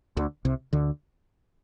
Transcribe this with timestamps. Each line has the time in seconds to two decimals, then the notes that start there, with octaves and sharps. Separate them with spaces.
0.17 D2 D3
0.45 C2 C3
0.73 D2 D3